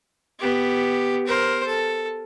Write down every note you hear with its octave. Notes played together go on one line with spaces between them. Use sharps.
B3 G4
A#4 C5
A4